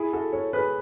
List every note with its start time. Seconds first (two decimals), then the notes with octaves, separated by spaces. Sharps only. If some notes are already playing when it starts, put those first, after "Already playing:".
Already playing: E4 G#4
0.13 F#4 A4
0.32 A4 C#5
0.53 G#4 B4